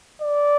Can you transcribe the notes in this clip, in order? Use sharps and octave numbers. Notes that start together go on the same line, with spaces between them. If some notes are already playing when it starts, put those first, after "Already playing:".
D5